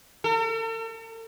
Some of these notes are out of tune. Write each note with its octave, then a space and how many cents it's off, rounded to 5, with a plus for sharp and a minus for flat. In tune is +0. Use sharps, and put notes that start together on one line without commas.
A4 +45